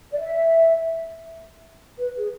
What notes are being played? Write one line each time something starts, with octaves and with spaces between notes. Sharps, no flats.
D5
E5
B4
G#4